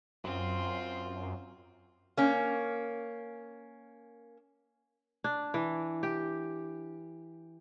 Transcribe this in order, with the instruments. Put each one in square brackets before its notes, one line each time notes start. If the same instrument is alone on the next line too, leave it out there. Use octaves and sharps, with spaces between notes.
[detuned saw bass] F#2 [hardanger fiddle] C4 F4
[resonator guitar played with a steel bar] A#3 C#4
[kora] D4
E3
G4